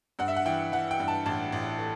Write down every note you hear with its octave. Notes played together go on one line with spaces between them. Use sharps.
G2 F#5
E5
F#5
E3 G5
E3 F#5
G5
G2
A5
A1 A5
A1
A3